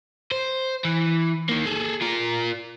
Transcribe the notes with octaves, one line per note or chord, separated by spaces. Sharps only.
C5
E3
D#3 A#3
G#4 A4
F4 A#4